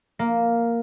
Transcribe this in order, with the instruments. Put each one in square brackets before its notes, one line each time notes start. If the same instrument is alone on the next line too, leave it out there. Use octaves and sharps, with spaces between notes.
[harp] A#3